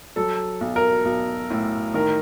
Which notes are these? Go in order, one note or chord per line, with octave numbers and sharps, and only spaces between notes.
F#3 A4
B1
A#4
B1
A2
D#3 A#4